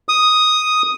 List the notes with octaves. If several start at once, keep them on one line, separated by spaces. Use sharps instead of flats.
D#6